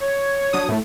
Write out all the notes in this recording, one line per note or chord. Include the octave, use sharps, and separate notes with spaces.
C#5
F#3 D4 D#6
A2 A3